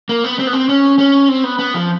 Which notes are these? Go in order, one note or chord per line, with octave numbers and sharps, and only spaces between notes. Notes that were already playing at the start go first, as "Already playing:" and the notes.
A#3
B3
C4
B3
C4
C#4
C#4
C4
B3
B3
F3